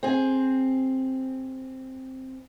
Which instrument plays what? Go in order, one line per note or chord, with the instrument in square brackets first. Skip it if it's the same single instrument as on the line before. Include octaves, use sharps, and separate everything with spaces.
[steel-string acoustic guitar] C4 G#4